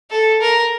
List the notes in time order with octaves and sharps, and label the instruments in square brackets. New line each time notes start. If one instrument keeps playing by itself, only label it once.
[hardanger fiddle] A4
A#4